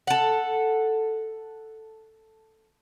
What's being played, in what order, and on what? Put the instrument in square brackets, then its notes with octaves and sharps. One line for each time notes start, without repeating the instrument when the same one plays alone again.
[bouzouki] A4 F#5